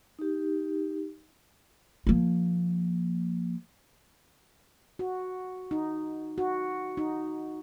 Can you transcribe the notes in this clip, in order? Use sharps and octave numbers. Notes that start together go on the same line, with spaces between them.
D#4 G4
F3 A#3
F#4
D#4
F#4
D#4